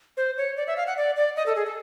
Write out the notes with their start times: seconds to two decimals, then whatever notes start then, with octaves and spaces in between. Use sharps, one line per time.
0.17 C5
0.37 C#5
0.57 D5
0.67 E5
0.77 F5
0.87 F#5
0.97 D5
1.16 D5
1.36 D#5
1.46 A4
1.56 G#4
1.66 A4